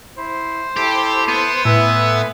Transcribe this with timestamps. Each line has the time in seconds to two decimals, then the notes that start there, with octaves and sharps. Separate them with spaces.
0.17 E4 C5
0.77 E4 G4 A4
1.28 B3
1.65 A2 B4 E5 G#5 C6